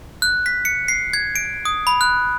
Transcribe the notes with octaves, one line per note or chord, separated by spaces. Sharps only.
F#6
B6
C#7
C7
G#6
D7
D#6
B5
F#6